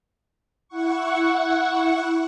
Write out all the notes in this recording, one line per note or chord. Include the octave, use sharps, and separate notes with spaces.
E4 F#5 C#6